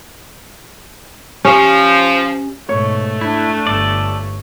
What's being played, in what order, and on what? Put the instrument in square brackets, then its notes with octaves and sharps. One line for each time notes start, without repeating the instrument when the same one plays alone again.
[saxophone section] F3 [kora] C#4 [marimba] G4
[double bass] G#2 B2 [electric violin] A3 [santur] C#5
[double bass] D4 [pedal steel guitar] E4
[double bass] G1 [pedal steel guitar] A4 D5